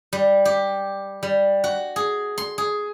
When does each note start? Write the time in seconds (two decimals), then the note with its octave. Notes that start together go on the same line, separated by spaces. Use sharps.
0.13 G3
0.45 G4
1.23 G3
1.64 F#4
1.96 G#4
2.38 C6
2.58 G#4